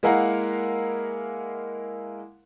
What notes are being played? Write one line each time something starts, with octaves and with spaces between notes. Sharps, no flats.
G#3 A#3 E4 A#4 F5 F#5